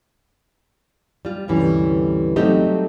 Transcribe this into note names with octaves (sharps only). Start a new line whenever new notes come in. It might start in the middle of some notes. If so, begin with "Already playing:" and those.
G3 F4
D2 G2 C3 E3 G3 C#4
F#3 G3 A3 C4 D#4 G4